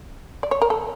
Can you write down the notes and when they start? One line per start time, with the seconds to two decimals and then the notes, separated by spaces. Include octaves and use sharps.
0.43 D5
0.51 C#5
0.62 A#4
0.70 A4